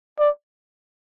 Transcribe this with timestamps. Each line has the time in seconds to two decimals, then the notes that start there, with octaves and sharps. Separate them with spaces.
0.19 D5